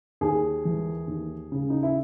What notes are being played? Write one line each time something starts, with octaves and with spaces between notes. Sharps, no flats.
D#2 G#4
E3
D#2
C#3
D#4
E4